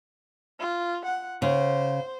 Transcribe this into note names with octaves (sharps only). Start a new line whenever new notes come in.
F4
F#5
C#3 C5